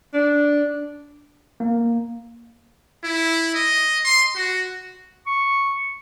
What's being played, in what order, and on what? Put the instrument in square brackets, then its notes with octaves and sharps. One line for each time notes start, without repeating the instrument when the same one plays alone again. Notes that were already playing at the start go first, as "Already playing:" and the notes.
[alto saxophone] D4
[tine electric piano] A#3
[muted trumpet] E4
D#5
C6
F#4
[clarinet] C#6